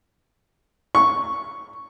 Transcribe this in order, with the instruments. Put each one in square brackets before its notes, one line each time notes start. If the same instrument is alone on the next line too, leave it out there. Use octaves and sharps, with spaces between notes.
[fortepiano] C#6